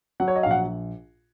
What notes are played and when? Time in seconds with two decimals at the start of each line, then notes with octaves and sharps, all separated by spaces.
0.20 F#3 F#5
0.28 C#5
0.36 D#5
0.43 A#1 F5
0.51 F#5